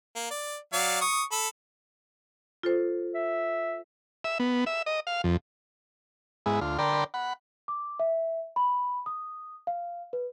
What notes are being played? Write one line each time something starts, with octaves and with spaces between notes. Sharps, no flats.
A#3
D5
F#3 D5 F5
C#6 D#6
A4 B5
F4 A4 C5
E5
E5
B3
E5
D#5
F5
F2
G#2 G#3 B3 E4
D2 F4
D3 A#4 D5 G5 B5 C6
F#5 B5
D6
E5
B5
D#6
F5
B4